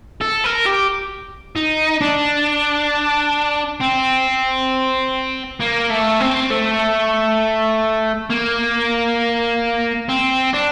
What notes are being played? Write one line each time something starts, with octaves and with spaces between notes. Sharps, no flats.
A4
A#4
G4
D#4
D4
C4
A#3
A3
C4
A3
A#3
C4
D4